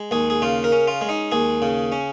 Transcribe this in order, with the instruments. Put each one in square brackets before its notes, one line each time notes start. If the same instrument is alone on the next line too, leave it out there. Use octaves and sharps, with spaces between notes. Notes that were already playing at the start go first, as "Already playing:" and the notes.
Already playing: [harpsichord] G#3
D#2 G#4
G#4
C#3 F4
A#4
C#4
F4
G#3
D#4
D#2 G#4
C#3
C#4